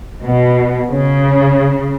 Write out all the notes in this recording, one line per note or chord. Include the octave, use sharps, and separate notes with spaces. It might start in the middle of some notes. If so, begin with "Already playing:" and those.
B2
C#3